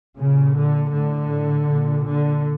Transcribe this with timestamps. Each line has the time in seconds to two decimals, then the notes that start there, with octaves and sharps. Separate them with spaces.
0.19 A#2 C#3
0.57 D3
0.94 A2 D3
1.69 A#2
2.06 D3